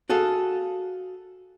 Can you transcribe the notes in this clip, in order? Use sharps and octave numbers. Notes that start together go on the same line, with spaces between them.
F#4 G#4 A4 F5